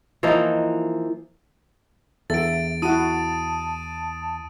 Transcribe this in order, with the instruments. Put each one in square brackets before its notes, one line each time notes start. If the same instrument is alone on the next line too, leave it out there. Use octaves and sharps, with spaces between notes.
[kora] E3 F3 A#3 D#4
[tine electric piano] E2 [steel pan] A4 [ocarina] E5 [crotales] A6 D7
[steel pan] E4 F#4 F#5 [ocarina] A5 [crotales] D#6 D#7